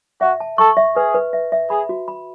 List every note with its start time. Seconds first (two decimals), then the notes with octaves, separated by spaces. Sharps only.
0.21 F#4 E5
0.40 A5
0.58 A4 C#6
0.77 E5
0.95 G#4 B4
1.15 B4
1.33 E5
1.52 E5
1.70 G#4 B5
1.89 F#4
2.08 B5